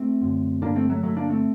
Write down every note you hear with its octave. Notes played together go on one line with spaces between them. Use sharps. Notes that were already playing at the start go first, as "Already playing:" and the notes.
Already playing: A3 C4
F#2 D3
G2 D3 A#3 D4
A3 C4
F#3 A3
G2 D3 F#3 A3
A#3 D4
A3 C4